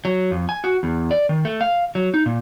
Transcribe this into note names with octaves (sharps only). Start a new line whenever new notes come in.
F#3
F2
G#5
F#4
E2
D5
D#3
A3
F5
F#3
D#4
A#2